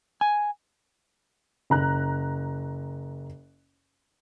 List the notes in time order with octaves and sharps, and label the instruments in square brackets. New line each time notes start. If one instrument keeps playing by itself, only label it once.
[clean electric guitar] G#5
[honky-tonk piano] F#1 A#5 F#6